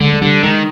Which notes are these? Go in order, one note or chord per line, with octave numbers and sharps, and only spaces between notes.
D3 G#3
G#3
D3 G3
D#3 G#3